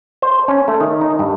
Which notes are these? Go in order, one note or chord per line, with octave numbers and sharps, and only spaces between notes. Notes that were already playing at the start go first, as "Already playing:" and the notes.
C5
C#4
A3
D#3
D#4
G2